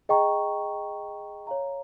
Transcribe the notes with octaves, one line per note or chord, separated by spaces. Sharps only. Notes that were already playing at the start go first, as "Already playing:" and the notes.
G#4 D#5 G5 A#5 C#6
C#5 F5 A#5